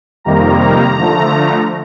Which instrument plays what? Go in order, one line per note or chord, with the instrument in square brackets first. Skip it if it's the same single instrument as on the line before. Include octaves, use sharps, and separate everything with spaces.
[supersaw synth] F2 C3 D#3 G3 A#3 A#5
D3 F3 A3